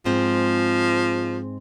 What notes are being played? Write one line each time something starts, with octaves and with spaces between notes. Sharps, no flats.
G#2 F3 G#3 C4